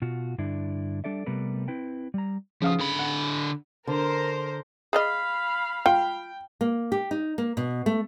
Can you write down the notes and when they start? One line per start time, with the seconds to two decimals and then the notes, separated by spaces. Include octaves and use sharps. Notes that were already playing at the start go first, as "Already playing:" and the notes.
0.02 B2 F4 F#4
0.38 G2 D3 D4 E4
1.04 G3 D4 A4 D5 E5
1.26 C3 G3 A3 B3 A#4 B4
1.68 C4 E4 B4 G5
2.14 G3 A#5
2.62 C#3 F3 F5 D#6
2.80 D3 B5
2.99 F#5
3.87 D3 A#4 C5
4.93 G#4 D5 D#5 F5 B5
5.86 F4 G5
6.61 A#3
6.92 G4
7.11 D#4
7.38 A#3
7.57 B2
7.86 A3